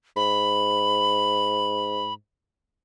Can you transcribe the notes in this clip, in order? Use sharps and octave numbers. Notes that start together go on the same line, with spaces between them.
G#2 B5